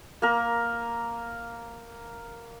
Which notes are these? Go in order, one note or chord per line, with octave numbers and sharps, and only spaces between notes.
A#3 A#4